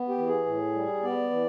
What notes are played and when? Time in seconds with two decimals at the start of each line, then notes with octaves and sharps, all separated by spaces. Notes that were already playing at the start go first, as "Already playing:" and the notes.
Already playing: B3
0.09 G4
0.18 E3
0.26 G#4
0.46 A2
0.74 G3
1.03 B3 D5
1.30 E3